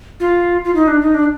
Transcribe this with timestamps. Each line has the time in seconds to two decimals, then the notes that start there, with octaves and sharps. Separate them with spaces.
0.20 F4
0.64 F4
0.75 D#4
0.88 D4
1.02 D#4
1.14 D4